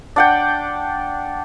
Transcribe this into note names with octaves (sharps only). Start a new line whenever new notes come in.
D4 F#5 G5